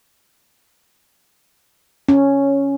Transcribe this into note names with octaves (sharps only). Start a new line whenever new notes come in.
C#4